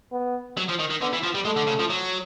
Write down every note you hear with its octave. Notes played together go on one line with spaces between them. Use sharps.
B3
F#3
F3
D#3
D#3
D3 B3
E3
F3
G3
G#3 A3
D3
C#3
F3
F#3